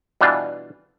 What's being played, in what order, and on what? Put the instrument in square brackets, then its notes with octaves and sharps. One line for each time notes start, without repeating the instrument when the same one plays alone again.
[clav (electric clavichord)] B2 E3 G3 D4 F4